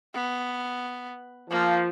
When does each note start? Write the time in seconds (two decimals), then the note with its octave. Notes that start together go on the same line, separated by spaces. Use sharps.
0.14 B3
1.51 F3 A#3